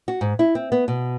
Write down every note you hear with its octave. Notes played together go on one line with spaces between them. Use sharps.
F#4
G#2
E4
C4
B3
B2